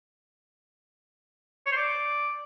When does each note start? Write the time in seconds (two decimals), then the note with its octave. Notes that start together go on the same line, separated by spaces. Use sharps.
1.66 C#5
1.72 C5
1.77 D5